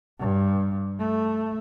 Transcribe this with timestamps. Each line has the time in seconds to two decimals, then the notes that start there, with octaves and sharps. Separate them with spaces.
0.20 G2
0.99 A3